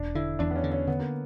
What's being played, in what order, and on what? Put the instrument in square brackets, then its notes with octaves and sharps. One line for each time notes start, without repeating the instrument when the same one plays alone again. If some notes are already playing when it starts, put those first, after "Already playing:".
Already playing: [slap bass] E1 [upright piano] D4
[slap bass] D3 [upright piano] E4
[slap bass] E2 [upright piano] D4
[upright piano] B3
C#4
[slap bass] D3
[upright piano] C#4
[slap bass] D3 [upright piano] B3
[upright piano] A#3